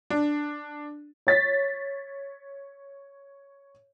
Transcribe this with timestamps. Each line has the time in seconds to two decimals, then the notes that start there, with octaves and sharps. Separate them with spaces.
0.10 D4
1.27 C#5 A6 B6